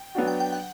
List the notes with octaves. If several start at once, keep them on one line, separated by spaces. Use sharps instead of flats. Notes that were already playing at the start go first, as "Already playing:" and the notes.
Already playing: G5
F#3 B3 D4 F#4
G5
G5
F#5